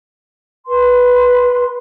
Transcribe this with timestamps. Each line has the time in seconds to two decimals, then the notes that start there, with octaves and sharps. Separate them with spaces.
0.66 B4 C6